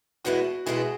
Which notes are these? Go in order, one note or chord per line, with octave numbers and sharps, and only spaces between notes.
E2 B2 G#3 B3 E4 F#4
E2 B2 G#3 B3 E4 G#4